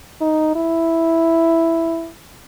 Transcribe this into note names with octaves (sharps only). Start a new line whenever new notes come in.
D#4
E4